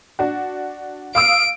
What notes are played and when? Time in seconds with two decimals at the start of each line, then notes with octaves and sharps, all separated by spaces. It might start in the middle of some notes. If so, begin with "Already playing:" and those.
0.19 D4 F#4
1.15 F5 D#6 E6 D7